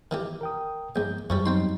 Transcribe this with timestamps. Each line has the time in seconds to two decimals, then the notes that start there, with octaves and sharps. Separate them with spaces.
0.11 D#3 E3 G4
0.41 A#4 G5 D#6
0.96 A#1 G#2 G6
1.30 F#2 E3 F3 G3 C#6
1.46 F#3 G3 C4 D#4 G5 C6